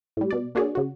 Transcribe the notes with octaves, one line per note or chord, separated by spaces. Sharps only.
A2 G3
B2 D5
A#3 D4 F#4 G#4 C#5 D5
C#3 F#4